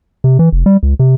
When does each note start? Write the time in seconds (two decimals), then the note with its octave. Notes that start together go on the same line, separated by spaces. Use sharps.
0.24 C3
0.39 E3
0.52 F1
0.66 G3
0.83 C#2
0.99 C3